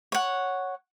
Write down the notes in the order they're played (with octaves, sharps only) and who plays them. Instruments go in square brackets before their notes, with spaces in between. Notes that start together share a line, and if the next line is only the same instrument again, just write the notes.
[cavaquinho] C#5 F#5